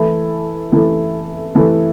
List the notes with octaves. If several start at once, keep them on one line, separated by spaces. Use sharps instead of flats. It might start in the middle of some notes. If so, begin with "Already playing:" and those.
Already playing: E3 A3 E4 A4
E3 A3 E4 A4
E3 A3 E4 A4